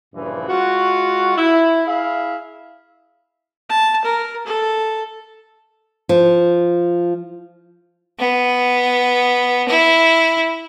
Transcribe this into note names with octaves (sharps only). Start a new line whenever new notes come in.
G2 A#2 C#3 E3 F3
G#3 F4 F#4
E4
E4 G#4 E5 F5
A5
A#4
A4
F3
B3
E4